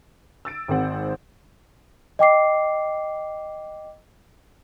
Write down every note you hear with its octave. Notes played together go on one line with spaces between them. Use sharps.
E6 A6 D7
G#1 D#3 G#3 C4 F#5
D#5 G5 D6 C7